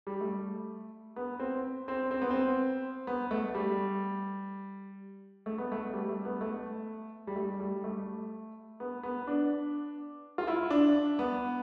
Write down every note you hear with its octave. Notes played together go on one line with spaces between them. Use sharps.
G3
A3
B3
C4
C4
C4
B3
C4
B3
A3
G3
A3
B3
A3
G3
A3
B3
A3
G3
A3
G3
A3
B3
B3
D4
F4
E4
D4
B3